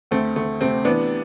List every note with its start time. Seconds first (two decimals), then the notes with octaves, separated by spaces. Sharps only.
0.11 D2 A3 C4
0.36 D2 A3
0.61 C3 A3 C4
0.85 E3 B3 D4